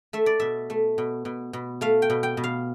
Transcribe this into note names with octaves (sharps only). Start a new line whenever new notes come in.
A3 E5
D5
B2 E5
A3
B2
B2
B2
A3 F5
G5
B2
G5
B2
F5